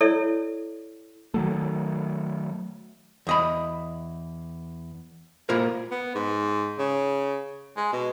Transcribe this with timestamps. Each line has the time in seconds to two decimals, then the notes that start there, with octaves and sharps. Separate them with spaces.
0.01 E4 A4 C#5 D5 E5
1.34 D#3 F#3 A3
3.27 E2 D#5 B5
5.49 A#3 E4 F4 A#4 C5
5.91 B3
6.15 G#2
6.79 C#3
7.77 G#3
7.93 B2